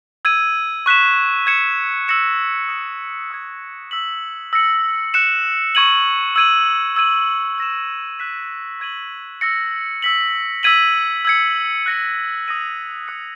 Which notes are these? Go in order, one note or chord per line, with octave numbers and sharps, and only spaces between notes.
E6 G#6 D#7
C#6 F#6 B6 E7
G#6 C#7 E7
E6 A#6 C#7 E7
D#6 A#6 E7
C#6 E6 G#6
E6 B6 F#7
E6 A#6 C#7 F#7
F#6 C#7 E7
C#6 G#6 D#7 F#7
E6 G#6 D#7 F#7
E6 G#6 D#7 F#7
E6 A#6 E7
F#6 B6 E7
C#6 G#6 D#7 F#7
E6 A#6 C#7
E6 B6 F#7
E6 G#6 B6 D#7 F#7
E6 G#6 C#7
F#6 A#6 C#7
D#6 A#6 D#7 F#7
D#6 F#6 C#7